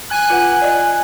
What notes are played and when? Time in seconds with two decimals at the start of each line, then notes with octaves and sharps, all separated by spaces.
0.10 G#5 F#6
0.30 F4 B4 F#5
0.62 D5 D#5